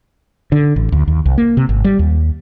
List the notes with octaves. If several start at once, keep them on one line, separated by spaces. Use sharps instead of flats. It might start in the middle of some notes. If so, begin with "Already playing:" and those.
D3
A1
D2
D#2
C2
A#3
C3
G#1
G3
D#2